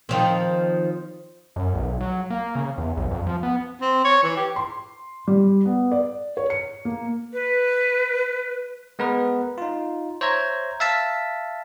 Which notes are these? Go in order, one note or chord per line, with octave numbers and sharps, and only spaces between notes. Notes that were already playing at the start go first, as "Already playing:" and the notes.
D#3 F3 C4
F#2
B1
F#3
A#3
C#3
E2
B1
F2
F3
B3
C4
C#5
E3
G4
C6
G3
B3
D5
C#5
C#7
A#3
B4
G#3 B3 A#4 B4
D#4 F4
C5 C#5 E5 A#5 G#6
E5 F5 A5 E6 B6